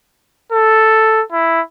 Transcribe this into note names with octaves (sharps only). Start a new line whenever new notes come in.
A4
E4